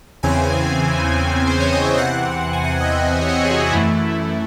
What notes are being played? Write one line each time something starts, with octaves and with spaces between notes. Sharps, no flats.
E2 C#3 E3 C4 G#5
C5
C#5
D#5
E5
E2 C3 E3 C4 F#5
F#5
G#5
F#5
D#5
E5
D#5
C#5
D#5
G#4
F#4
F#2 E3 A3 E4